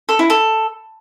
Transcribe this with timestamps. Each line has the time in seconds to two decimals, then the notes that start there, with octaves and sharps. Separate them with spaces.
0.09 A4
0.19 E4
0.30 A4